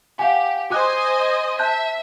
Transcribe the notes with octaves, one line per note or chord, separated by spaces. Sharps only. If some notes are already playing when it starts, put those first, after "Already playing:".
G4 F5 F#5 G#5
F#4 C5 D#5 G#5 D6 F#6
E5 A5 F#6 G6